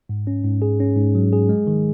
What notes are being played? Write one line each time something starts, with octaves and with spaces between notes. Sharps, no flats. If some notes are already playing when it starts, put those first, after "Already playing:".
G#2
C#4
G#2
G#4
C#4
G#2
F#3
G#4
G#3
D#3